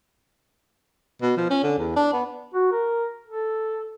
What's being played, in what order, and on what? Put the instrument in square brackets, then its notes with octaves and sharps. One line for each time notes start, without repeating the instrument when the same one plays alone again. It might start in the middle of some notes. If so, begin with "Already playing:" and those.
[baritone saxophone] B2
F3
C#4
D3
E2
D4
B3
[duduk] F#4
A#4
A4